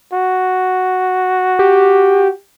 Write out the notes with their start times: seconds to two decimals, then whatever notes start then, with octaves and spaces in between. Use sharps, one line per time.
0.13 F#4
1.59 G4